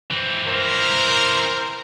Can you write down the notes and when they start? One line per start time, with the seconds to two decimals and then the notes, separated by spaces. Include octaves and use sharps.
0.11 E3 C4
0.47 A#4 C5